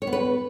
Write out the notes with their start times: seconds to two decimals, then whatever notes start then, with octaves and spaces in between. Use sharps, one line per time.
0.02 C#5
0.07 B3
0.13 B4